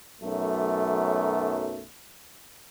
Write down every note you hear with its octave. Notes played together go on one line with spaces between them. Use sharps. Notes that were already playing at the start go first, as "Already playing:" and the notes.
B1 F#2 A3